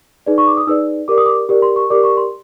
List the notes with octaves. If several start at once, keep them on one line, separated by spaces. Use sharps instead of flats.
D#4 G#4 B4 D5
C#6
D6
D#6
D#4 G#4 B4 D5 E6
G4 A#4 D5 D6
D#6
D6
G4 A#4 D5
C6
C#6
G4 A#4 D5 D6
C#6
C6